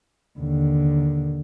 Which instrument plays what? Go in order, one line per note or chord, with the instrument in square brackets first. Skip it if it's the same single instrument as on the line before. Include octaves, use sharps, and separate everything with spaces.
[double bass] D#2 D3